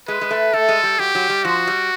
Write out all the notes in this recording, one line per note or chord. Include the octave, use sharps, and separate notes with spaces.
G#3 B4
G#3
A3
A3 A4
G#3
G3
F#3 G4
F#3
G3
F3 F#4
G3